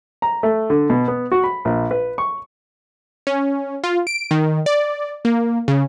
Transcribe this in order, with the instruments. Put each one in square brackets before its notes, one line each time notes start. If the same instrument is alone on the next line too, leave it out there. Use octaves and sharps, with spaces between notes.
[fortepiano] A#5
A3
D3
B2
B3
F#4
B5
A#1
B4
C#6
[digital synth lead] C#4
F4
D7
D#3
D5
A#3
C#3